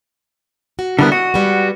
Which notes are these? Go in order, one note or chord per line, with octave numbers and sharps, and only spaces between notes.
F#4
D3 G3 B3 D4 E4 A#4
F#4 D#5
G3 G#3 B3